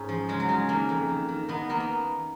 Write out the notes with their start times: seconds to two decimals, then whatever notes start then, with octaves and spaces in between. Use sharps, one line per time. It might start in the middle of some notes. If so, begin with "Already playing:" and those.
Already playing: G#2 C#4 D#4
0.09 F3
0.29 C#3 G#3
0.40 F#3
0.49 C#3 G#3
0.69 D#3 A#3
0.89 F2
1.09 D#3
1.28 D#3
1.49 D#3 B3
1.69 D#3 A#3
1.80 B3